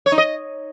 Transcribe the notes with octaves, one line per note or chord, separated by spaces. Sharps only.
C#5
D#4
D#5